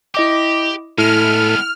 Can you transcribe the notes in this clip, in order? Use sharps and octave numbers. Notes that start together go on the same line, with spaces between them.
E4 G4 D#5 D6
A2 G#3 B3 E4 A4 F6